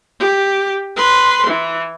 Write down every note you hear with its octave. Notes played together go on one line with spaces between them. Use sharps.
G4
B4 C6
E3